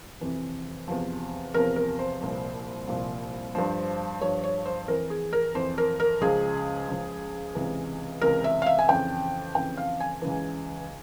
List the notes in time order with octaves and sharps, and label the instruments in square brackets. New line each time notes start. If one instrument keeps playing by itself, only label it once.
[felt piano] F2 C3 E3
E2 C3 F3
E2 C3 F3 A#4
A#4
C5
C2 A#2 F3
C2 A#2 F3
G2 F3 C5
G2 F3 C#5
C#5
C5
F2 E3 A#4
G#4
A#4
F2 E3 C5
A#4
A#4
C#2 C#3 F3 G#4
C#2 C#3 F3
C#2 C3 E3
C#2 C3 E3 A#4
E5
F5
E5
G#5
F2 C#3 E3 G5
F2 C#3 E3 G5
F5
G#5
C#2 C#3 E3